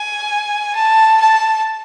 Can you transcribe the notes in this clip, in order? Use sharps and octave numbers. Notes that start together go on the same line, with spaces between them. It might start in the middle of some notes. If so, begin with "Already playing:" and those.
Already playing: G#5
A5
A5